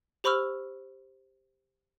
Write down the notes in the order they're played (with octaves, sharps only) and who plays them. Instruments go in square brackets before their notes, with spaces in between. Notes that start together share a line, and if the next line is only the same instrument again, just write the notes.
[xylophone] G4 C5 B5 C#6 E6 F6